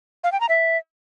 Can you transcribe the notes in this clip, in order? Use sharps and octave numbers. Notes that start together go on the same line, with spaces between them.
F5
G5
A#5
E5